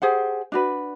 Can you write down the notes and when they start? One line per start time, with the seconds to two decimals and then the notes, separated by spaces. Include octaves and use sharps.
0.02 G4 G#4 C5 F#5
0.52 D4 F#4 B4